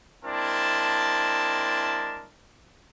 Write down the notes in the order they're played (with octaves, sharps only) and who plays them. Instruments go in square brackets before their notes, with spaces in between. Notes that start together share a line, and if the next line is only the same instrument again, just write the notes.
[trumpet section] G#3 C4 D4 E4 A#4 A5